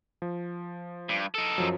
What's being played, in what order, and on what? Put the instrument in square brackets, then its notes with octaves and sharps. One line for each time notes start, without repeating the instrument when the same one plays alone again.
[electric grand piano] F3
[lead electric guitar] G2
D#4 A4
[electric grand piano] F#2 F3 F#3